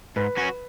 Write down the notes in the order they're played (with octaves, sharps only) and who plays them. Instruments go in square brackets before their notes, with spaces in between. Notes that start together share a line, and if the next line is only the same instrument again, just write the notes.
[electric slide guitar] G#2 [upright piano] B4
[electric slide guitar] F#3 C#4 F#4